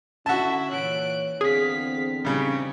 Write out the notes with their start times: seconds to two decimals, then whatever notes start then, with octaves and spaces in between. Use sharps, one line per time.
0.26 D3 C#4 E4 F#4 E5 A5
0.70 A#2 E3 C#5 F#6 D7
1.41 E2 D3 C4 G#4 F5 B6
2.25 C#3 G3 D#4 C#5